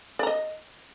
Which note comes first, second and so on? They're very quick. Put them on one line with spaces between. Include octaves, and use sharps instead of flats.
D5 A#5 D#5